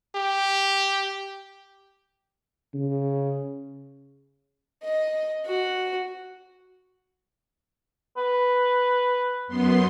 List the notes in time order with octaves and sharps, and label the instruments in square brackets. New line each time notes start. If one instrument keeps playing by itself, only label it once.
[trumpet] G4
[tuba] C#3
[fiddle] D#5
F#4
[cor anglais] B4
[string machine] F#2 B3 C6